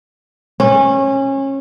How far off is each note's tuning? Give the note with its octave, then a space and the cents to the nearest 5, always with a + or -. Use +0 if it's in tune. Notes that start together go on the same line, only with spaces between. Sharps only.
C#4 -25